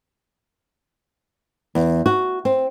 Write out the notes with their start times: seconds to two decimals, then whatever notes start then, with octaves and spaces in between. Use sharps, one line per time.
1.75 E2
2.06 F#4
2.45 C4